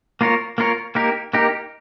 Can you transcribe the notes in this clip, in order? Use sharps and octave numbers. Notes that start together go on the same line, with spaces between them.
A#3 F4 A#4 C#5
A#3 F4 A#4 C#5
A#3 D#4 G4 A#4
A#3 D#4 G4 A#4